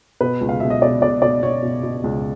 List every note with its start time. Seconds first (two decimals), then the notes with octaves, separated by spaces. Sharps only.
0.21 B2 B4
0.41 C#2
0.49 F5
0.60 B2 E5
0.70 D#5
0.82 B2 D5
1.01 B2 D5
1.22 B2 D5
1.43 B2 C#5
1.62 B2
1.83 B2
2.04 C#2